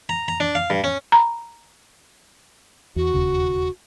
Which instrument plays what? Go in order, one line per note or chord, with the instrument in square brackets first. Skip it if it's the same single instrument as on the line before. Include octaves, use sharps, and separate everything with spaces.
[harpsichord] A#5
A#5
D4
F5
G2
C#4
[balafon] A#5 B5
[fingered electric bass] E2 [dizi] F#4
[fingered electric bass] E1 D#2 C#3